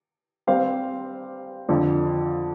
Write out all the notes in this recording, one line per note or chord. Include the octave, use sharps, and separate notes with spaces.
G3 C4 G4 C5 F5
F2 D3 F3